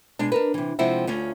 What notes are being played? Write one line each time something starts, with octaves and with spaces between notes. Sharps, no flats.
B2 G#3 D4
D4 A#4 B4
C3 E3
C3 F3 G#3 C4 E4 F#5
D2 C#4 F4